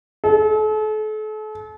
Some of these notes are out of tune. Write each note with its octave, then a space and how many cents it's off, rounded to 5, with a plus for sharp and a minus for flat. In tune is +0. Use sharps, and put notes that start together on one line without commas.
A4 -40